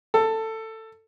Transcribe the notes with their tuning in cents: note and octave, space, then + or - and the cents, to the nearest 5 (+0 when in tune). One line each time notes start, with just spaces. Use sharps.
A4 +15